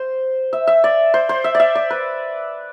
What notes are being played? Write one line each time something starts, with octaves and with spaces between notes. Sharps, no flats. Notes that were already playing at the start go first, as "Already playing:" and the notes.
Already playing: C5
E5
E5
D5
C5
C5
E5
D5 E5
D5
B4